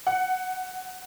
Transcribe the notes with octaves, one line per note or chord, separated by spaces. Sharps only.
F#5